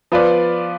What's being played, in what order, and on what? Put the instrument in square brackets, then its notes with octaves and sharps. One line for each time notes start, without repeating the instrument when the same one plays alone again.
[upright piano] F3 B3 F4 B4 D5